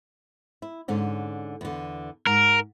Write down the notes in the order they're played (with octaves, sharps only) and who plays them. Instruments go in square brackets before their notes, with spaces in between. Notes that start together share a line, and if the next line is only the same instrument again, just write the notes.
[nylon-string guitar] E4
G#2 D3 C#4
E2 D3
[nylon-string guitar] G#2 [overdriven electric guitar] A#4